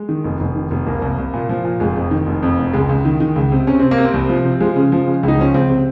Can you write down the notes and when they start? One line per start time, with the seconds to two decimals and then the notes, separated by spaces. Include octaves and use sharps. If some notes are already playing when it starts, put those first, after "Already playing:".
Already playing: G#3
0.09 D#3
0.24 F1
0.40 F1
0.56 D#3
0.71 F1
0.86 C2 A#3
1.02 C2
1.18 C2
1.33 A#2
1.49 F3
1.65 A#2
1.80 F1 G#3
1.96 F2
2.11 D#3
2.27 F1
2.43 F2
2.58 F1
2.73 C#2 G#3
2.89 C#2
3.05 D#3
3.20 D#3
3.36 C#2
3.52 C3
3.67 C3 C#4
3.79 C3 C4
3.91 A#3
3.98 C3
4.04 C4
4.14 C2
4.29 F3
4.45 C3
4.60 F3 G#3
4.76 C#3
4.92 F3
5.07 C#3
5.23 C#2
5.28 D#4
5.39 F3 C#4
5.54 C#2 C4
5.70 C3